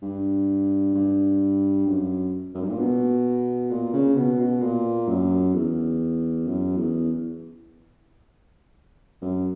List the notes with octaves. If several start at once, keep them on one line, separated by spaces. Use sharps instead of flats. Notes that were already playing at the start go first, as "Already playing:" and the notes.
G2
G2
F#2
F#2
G2
A#2
B2
A#2
C#3
B2
B2
A#2
F#2
E2
F#2
E2
F#2